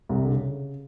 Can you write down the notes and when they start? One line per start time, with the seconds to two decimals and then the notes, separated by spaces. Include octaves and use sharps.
0.09 C2 C3
0.24 D3
0.32 C#3